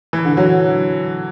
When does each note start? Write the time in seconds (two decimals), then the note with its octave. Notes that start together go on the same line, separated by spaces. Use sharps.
0.13 E3
0.25 D3
0.37 F#3